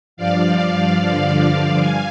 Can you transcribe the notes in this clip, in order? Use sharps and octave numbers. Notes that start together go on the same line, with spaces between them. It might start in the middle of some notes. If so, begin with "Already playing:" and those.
G2 F3 D5 F5
G2 D3 F3
G2 F5 G#5